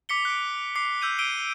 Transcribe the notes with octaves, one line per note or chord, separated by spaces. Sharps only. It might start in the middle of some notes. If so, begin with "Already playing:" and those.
D6 B6 C#7 G7
F#6 C#7 D7
D6 C7
E6 G6 D#7
E6 D7 D#7 G7